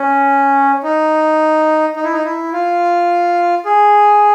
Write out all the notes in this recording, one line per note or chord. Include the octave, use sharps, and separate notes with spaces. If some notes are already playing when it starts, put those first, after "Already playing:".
Already playing: C#4
D#4
D#4
E4
D#4
E4
F4
G#4